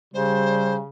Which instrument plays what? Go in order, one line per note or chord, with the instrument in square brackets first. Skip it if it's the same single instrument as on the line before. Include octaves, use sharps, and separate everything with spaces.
[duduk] C#3 [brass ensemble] G3 [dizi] C5